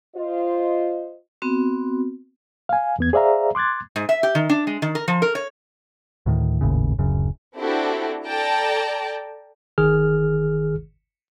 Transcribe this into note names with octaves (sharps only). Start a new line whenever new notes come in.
F4 C5 D#5
B3 C4 F#4
F5 G#5
E2 B3 G#6
G#4 C5 D5 E5 F5 A#5
C6 D6 F#6 G#6 A6
G#2
E5
G4
D#3
D4
G#3
D#3
A#4
F3
A#4
C#5
D2 A2 D#3
G#1 D#2 A2 C#3
D1 F#2 C#3
C4 D4 E4 F#4 G4 A4
A4 D5 G5 A5 A#5
G1 D#3 G#4 F6